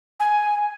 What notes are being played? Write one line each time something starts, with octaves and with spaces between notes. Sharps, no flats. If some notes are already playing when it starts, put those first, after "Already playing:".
G#5